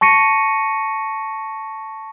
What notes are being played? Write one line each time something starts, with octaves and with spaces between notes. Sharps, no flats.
A5 C#6 A#6 C#7 D#7